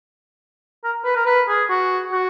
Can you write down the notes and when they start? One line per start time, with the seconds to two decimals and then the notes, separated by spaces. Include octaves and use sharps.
0.84 A#4
1.05 B4
1.16 A#4
1.26 B4
1.48 G#4
1.70 F#4
2.12 F#4